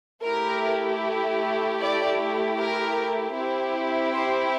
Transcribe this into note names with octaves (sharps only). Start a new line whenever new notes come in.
A3 E4 G4 A#4
D5
A#4
C4 E4 G4
C5